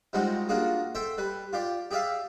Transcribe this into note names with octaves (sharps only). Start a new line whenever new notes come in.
F3 G3 G#3 C4 D#4 F#4
A#3 D4 F4 F#4 G#4
A4 C5 E5 G5
G3 B4
F4 G4 D5
G4 G#4 D5 E5 F5